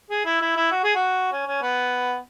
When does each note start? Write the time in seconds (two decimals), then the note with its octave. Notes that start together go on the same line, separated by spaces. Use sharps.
0.11 G#4
0.26 E4
0.42 E4
0.57 E4
0.71 F#4
0.84 G#4
0.95 F#4
1.32 C#4
1.47 C#4
1.62 B3